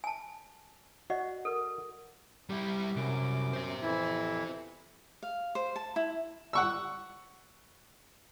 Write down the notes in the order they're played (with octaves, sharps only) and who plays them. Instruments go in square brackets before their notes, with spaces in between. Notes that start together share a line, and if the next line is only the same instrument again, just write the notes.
[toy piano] G#5 A5
[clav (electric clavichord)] F#4 [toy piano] D5 D#5 F#5
[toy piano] A4 A#4
[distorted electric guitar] G3 E4 [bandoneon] G4
[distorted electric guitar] C2 [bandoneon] F#2 D6
[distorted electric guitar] C5 E5
[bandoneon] F2 E3 E4
[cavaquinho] F5
C5
A5
E4
[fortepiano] F#5 C#6 E6